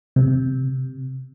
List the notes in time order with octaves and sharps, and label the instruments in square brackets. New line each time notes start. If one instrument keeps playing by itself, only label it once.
[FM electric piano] C3